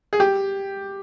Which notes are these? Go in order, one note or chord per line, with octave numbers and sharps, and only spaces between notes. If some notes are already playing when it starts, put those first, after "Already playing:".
G#4
G4